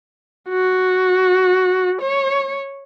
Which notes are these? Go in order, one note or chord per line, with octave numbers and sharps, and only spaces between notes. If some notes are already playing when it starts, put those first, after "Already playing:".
F#4
C#5